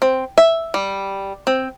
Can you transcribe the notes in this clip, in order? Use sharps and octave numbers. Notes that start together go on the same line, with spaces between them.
C4
E5
G3
C4